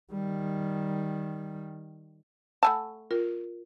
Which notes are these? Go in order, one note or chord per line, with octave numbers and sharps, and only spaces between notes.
D#3 G3
A3 F#5 G#5 A5 B5 E6
F4 A#4